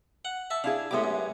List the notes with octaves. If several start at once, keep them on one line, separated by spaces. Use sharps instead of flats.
F#5
E5 A5
D4 E4 G#4 F5
A2 G#3 B3 G4 D6
F#2